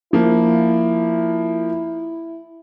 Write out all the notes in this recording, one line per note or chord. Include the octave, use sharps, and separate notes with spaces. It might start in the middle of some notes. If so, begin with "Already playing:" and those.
F3 A#3 E4